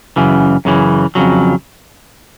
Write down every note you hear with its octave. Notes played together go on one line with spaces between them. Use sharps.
F#2 C#3 E3
F#2 C#3 E3
F2 C#3 F#3